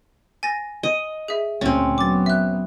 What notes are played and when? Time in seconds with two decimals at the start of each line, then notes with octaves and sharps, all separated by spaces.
0.43 G#5 A6 A#6
0.83 D#5
1.28 G#4 E5
1.61 D2 A#2 C4 C#4
1.98 F#3 B3 D6 A6
2.26 E5 F#6